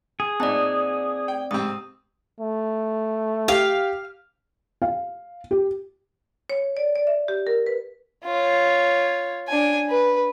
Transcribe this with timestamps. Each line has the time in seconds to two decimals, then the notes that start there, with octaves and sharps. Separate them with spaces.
0.20 G#4
0.40 A#2 C4 D#4 D5 A5
1.28 G5
1.51 G#2 C3 C4 D#6
2.40 A3
3.48 G4 F5
4.82 F5
5.51 G4
6.50 C#5
6.77 D5
6.95 D5
7.07 E5
7.28 G4
7.47 A#4
7.67 B4
8.25 F4 C#5
9.49 D4 G#5
9.90 B4